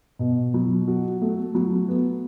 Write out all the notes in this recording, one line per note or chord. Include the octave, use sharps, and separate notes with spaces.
B2
F#3
F#4
A3
F#3
B3